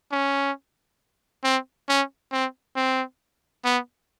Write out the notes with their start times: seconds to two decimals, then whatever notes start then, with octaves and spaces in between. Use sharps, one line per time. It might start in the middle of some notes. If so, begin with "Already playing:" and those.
0.12 C#4
1.44 C4
1.89 C#4
2.32 C4
2.76 C4
3.65 B3